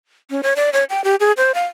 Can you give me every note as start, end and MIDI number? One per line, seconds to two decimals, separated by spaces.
0.30 0.41 61
0.43 0.54 73
0.56 0.70 74
0.73 0.84 73
0.90 1.03 79
1.04 1.16 67
1.20 1.32 68
1.37 1.52 72
1.54 1.66 77